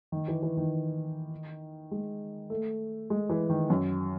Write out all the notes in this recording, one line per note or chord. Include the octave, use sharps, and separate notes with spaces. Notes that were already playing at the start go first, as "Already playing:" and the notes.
D#3
E3
E3
D#3
G#3
A3
G#3
E3
D#3
F#2